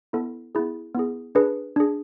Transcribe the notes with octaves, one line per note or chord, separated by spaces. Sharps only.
B3 E4 A4
B3 E4 G#4
B3 E4 G#4
D4 G#4 B4
D4 G#4